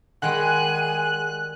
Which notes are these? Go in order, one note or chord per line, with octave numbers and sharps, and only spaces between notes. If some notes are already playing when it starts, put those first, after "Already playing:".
D#3 G3 G#3 G#4 F#5 G#5 F#6